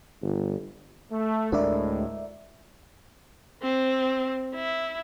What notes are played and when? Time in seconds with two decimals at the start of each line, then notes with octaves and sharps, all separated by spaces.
0.23 G1
1.10 A3
1.52 D2 A2 G#3 D4 A#4 D5 E5
3.63 C4
4.55 E4